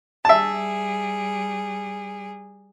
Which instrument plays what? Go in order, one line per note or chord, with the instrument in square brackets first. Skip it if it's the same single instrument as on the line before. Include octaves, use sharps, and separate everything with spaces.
[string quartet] G3 G#4 [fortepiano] E5 A5